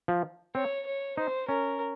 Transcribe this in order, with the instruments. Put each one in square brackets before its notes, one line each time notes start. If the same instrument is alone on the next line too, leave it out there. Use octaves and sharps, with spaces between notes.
[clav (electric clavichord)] F3
[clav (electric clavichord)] C4 [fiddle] C#5
[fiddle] C#5
[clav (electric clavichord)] D#4 [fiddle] C5
[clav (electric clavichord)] C#4 [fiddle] A#4